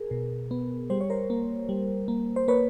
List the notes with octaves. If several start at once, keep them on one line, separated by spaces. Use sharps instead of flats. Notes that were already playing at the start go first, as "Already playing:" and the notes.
Already playing: G#4 A#4
B2
B3
G3 C5
C#5
A#4 C5
A#3
G3
A#3
C5
A#3 B4 C#5